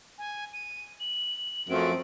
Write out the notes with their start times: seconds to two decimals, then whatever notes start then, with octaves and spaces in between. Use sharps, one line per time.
0.18 G#5
0.53 D#7
1.00 F#7
1.69 F#2 F3 A3 C4 D7